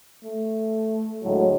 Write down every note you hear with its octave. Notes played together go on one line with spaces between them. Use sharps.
A3
D2 A2 F#3 G#3